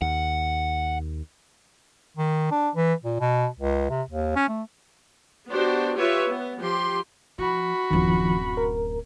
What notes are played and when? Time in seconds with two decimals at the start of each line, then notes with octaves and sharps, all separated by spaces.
0.02 D#2 F#5
2.17 D#3
2.51 D4
2.75 E3
3.03 A#2
3.20 B2
3.59 C#2
3.90 C3
4.10 D#2
4.35 C#4
4.48 A3
5.48 B3 D4 F#4 G4 C5
5.95 F4 G4 B4 C#5 E5
6.26 B3
6.58 F3 G4 C6
7.39 F3 F#4 B5
7.91 D1 F#2 D#3 F3
8.57 A#4